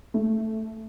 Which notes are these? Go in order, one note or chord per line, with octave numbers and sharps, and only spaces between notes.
A3